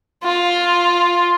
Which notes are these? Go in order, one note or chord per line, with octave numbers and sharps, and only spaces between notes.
F4